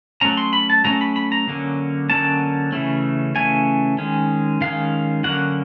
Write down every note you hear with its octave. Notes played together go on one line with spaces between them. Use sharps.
F#3 A3 C#4 A#5
C6
B5
A5
F#3 A3 C#4 A#5
B5
B5
A#5
D3 F#3 A#3 C#4
D3 F#3 A#3 C#4 A5
C#3 E3 A3 C#4
C#3 E3 A3 C#4 G#5
D#3 G#3 C#4
D#3 G#3 C#4 F5
D3 F#3 A#3 C#4 F#5